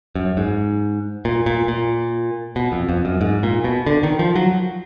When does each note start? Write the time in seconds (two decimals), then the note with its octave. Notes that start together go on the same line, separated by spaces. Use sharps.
0.15 F#2
0.37 G#2
1.25 A#2
1.46 A#2
1.68 A#2
2.56 B2
2.72 F2
2.89 F2
3.05 F#2
3.21 G#2
3.43 A#2
3.64 B2
3.86 D3
4.03 D#3
4.19 F3
4.36 F#3